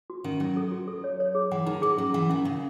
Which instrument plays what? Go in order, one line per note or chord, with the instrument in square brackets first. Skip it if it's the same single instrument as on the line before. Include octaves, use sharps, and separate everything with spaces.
[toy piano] F#4
[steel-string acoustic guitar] D#3 [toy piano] C#4
[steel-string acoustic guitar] F#3 [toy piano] C#4
[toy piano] A4
F#4
A4
C#5
C#5
G#4
[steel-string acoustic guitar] E3 [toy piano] F#5
[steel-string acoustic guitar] D#3 [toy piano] D#4
[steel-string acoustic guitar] F#3 [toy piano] G#4
[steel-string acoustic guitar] F#3 [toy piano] C#4
[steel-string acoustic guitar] E3 [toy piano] F#5
[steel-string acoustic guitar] D#3 [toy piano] C#4
[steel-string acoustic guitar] C#3 [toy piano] F#5